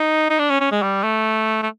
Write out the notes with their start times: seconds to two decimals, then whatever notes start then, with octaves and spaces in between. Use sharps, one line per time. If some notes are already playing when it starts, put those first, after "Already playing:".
Already playing: D#4
0.30 D#4
0.39 D4
0.50 C#4
0.60 C#4
0.72 G#3
0.82 G3
1.03 A3
1.62 A3